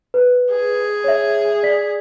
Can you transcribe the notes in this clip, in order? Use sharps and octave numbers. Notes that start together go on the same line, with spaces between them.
B4
G#4
C#5 E5
D5 B6